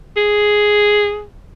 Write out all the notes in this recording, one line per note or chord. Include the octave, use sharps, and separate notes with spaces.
G#4